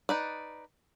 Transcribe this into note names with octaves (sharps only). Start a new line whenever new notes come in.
D#4 B4 D5